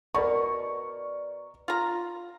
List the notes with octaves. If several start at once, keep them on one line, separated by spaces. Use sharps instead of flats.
B2 A#4 D5 C#6
F4 A#5